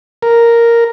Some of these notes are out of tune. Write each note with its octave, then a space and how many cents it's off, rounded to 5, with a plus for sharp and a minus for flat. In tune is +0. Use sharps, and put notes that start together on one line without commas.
A#4 +0